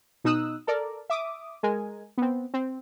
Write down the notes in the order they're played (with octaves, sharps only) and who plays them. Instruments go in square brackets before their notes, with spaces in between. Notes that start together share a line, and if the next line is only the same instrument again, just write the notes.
[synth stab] B2 D#4 D#6 E6 F#6
A4 A#4 D5
E5 D6 D#6
G#3 A#4 G#5
B3 C4
C4